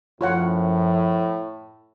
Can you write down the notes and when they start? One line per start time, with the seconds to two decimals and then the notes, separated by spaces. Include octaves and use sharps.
0.21 F#2 A2 F3 F4 C#5 F#5